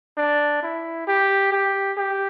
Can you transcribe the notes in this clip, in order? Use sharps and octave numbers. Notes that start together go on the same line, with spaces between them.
D4
E4
G4
G4
G4